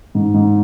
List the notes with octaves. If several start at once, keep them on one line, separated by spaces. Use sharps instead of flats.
G#2
G#2